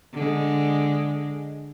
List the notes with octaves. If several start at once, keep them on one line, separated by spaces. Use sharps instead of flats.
D3 G#3